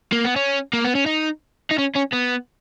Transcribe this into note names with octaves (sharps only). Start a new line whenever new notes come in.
A#3
B3
C#4
A#3
B3
C#4
D#4
D#4
C#4
C#4
B3